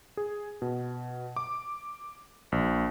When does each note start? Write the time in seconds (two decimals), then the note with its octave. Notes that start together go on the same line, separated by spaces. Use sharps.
0.17 G#4
0.62 B2
1.36 D6
2.52 A#1